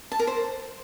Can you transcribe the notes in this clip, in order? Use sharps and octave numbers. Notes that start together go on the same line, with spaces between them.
A5
A#4
C5